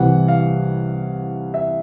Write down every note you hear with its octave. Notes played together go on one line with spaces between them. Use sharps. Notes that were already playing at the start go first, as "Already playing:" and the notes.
Already playing: C2 C3 E3 F#5
F5
E5